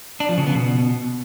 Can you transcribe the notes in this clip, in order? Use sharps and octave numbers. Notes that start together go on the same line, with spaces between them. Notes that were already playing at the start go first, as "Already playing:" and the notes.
D4
F3
C#3
B3
B2